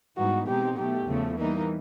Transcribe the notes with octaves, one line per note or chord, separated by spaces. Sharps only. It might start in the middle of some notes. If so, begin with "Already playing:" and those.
G#2 E3 G3 B3 D#4 F#4
B2 G#3 C4 D#4 G4
B2 F#3 A3 G4
E2 C#3 F3 A3
E3 G3 A#3 D#4